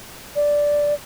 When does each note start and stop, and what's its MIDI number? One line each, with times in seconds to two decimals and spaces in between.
0.36 0.94 74